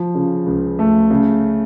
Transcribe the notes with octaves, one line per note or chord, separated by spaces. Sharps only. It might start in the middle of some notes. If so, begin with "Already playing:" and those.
Already playing: F3
C#3
C#2
A3
C#3